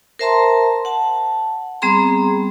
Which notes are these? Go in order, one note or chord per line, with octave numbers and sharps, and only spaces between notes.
A#4 C5 E5 A5 A#5 C6
F#5 A5
G3 B3 C4 G#4 A#5 C6